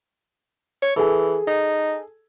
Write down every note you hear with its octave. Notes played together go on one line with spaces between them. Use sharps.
C#5
E3 G#4 A4
D#4